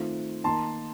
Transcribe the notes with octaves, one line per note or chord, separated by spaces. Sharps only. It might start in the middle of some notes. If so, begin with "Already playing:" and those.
Already playing: D#3 A3 C4 F4
D#3 A#3 D#4 A5 C6